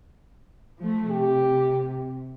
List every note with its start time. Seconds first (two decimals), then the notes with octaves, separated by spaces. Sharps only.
0.78 F3 A3
1.11 C3 G4